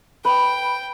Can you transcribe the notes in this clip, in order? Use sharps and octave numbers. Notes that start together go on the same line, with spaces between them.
B4 G5 B5